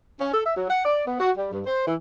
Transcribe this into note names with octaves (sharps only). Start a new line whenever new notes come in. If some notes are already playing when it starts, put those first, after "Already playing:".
C#4
A4
E5
F#3
F#5
D5
B3
F#4
G3
G2
C5
E3